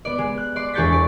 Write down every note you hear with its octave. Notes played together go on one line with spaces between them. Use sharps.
B3 D5
G#3
F#6
D5 C6
E1 G#4 C#6 G6 A6 B6
D5